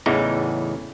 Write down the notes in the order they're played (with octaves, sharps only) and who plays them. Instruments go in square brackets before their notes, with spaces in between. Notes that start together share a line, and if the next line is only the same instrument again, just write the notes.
[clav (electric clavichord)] E2 A2 C#3 E3 D#4